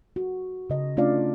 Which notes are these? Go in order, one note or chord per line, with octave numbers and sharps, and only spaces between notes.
F#4
C#3 D#5
A3 C#4 D4 F4 D5 F5